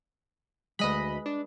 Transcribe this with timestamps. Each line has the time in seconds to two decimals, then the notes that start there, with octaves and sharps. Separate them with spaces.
0.79 D2 G#3 B4 D#5 B5
1.26 D4